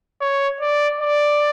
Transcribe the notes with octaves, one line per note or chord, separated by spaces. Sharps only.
C#5
D5
D5